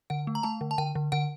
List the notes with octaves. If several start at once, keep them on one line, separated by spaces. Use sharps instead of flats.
D3 F#5
A3
A#5
A3 A5
D3
A5
D3 G5
D3
D3 F#5